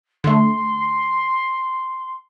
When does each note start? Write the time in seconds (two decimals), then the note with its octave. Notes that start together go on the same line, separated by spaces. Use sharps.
0.24 D3 A3 C6